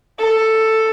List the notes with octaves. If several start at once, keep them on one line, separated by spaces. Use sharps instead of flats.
A4